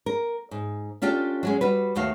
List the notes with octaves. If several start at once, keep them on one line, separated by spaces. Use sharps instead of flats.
A#4
G#2
C#4 D4 F4 G4 A4
F#3 G#3 C#4
G3 F#4 B4
D#2 A3 F#4 F5